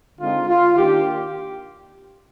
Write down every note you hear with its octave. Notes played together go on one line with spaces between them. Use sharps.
D3 G#3 C4 D#4 F4
F4
D#3 A#3 D4 G4